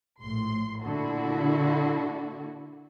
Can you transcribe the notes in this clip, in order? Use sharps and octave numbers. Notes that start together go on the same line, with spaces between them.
A#1 A2 C6
A#2 D3 E4 F#4 A4